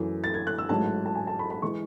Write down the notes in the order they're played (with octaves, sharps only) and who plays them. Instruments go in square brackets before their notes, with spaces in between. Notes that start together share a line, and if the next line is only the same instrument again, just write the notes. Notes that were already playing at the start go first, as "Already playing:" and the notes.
Already playing: [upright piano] F#2 E3 A3
A6
G#6
F#6
E6
A1 G#2 F#3 A5
A5
G#5
A5
B5
B5
E3 G#3 C#6